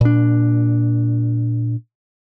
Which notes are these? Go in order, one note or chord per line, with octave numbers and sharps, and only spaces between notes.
A#2 D4